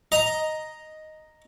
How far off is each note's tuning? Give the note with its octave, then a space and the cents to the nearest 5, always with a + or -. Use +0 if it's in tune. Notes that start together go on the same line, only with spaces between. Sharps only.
D#5 +0 A#5 +0